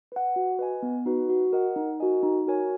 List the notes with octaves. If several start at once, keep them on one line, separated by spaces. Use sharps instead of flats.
B4 F#5
F#4
B4 D#5 G#5
B3
D#4 F#4 B4
F#4
A#4 D#5 F#5
D#4
F#4 A#4 D#5 G#5
D#4
F#4 A#4 C#5 G#5